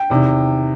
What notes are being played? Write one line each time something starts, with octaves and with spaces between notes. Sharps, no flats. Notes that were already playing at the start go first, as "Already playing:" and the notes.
Already playing: G5
E2 C3 D#3